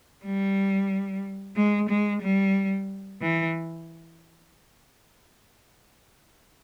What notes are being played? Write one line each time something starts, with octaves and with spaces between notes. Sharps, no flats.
G3
G#3
G#3
G3
E3